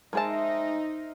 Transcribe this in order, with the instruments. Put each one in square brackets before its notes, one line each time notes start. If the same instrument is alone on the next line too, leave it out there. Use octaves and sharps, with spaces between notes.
[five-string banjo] G#3 G#4 A5 [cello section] D#4 [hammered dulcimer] A#4 C5 E5